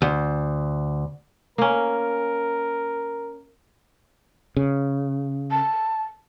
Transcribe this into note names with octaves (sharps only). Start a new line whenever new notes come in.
D2
A#3 C#4 A#4
C#3
A5